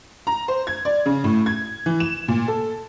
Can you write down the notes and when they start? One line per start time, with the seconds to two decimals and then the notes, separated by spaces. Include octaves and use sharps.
0.27 A#5
0.48 C5
0.67 G#6
0.85 D5
1.06 C#3
1.24 A2
1.46 G#6
1.86 E3
2.00 E7
2.28 A#2
2.48 A4